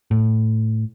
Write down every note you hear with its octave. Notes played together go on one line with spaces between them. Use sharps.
A2